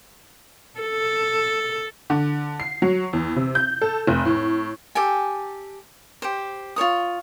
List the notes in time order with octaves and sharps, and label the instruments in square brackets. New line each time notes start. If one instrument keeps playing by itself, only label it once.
[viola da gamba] A4
[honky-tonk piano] D3
C7
F#3
E2
C3
G6
A4
F1
A2
[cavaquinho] G4 A4 G5 G#5
G4 C5
F4 A4 C#5 D#6